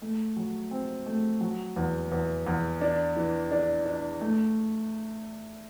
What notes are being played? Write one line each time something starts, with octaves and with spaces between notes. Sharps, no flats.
A3
F#3
C4
A3
F#3
E2
E2
E2
D4
E3
D4
D4
A3